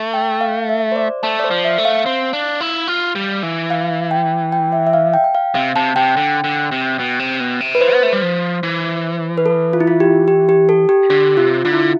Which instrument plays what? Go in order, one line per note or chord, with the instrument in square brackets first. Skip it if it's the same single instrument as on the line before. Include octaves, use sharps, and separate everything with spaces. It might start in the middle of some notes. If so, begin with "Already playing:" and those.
Already playing: [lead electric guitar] A3
[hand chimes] G5
F5
E5
C5
D5
[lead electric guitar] A3 [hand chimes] A5
[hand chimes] D5
C5
[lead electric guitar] F3
[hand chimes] E5
[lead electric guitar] A3
[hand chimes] F5
[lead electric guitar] C4
D4
E4
F4
G3
E3
[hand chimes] F5
G5
G5
E5
E5
F5
G5
G5
F5
[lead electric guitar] C3 [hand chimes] F5
[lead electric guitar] C3 [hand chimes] A5
[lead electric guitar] C3 [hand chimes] G5
[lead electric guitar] D3
D3
C3
B2
C3
B2
C3
[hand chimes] B4
[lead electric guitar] E3 [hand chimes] C5
[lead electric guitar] B3
A3
G3
F3
E3
[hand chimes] B4
A4
F4
E4
F4
G4
G4
G4
A4
G4
[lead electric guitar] D3 [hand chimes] G4
[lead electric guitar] C3 [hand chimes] F4
[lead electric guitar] D3 [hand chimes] F4
[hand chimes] E4
F4